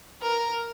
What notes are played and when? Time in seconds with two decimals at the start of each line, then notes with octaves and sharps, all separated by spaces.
0.22 A#4